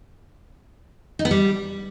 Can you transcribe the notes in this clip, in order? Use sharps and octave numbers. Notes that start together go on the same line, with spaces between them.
D#4
B3
G3